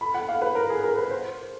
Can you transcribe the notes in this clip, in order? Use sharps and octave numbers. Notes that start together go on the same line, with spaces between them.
B5
F#5
F5
B4
A#4
G#4
A#4
B4
C5